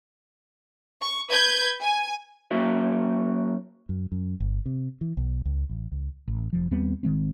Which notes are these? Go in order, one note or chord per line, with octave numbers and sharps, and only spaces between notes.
C#6
B4 G6 G#6
G#5
F#2 A#3 F#4 E5
F#2
F#2
G1
C3
E3
B1
C#2
A1
C#2
A1
F1 F3
D#2 G3 B3 C4
G#1 D#3 G#3 C4